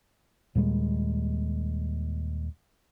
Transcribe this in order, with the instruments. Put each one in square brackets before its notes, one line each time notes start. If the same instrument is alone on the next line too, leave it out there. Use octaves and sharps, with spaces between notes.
[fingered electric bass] D#2 A#2 G3 G#3